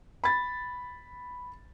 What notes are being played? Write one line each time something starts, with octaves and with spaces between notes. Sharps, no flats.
B5 A6